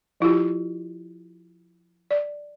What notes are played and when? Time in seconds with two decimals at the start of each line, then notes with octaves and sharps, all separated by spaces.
0.20 F3 E4 F4 G4
2.11 D5